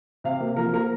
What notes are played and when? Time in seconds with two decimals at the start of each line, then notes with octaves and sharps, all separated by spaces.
0.24 C3 F5
0.40 A#3
0.56 F3 A#4
0.73 A#3 A#4